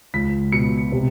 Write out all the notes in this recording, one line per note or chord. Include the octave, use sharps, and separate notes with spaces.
C#2 B6
B2 C#7
C3